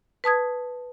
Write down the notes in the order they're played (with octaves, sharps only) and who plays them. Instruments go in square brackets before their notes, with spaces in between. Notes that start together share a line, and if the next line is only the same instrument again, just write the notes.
[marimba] B4 A5 D#6 G#6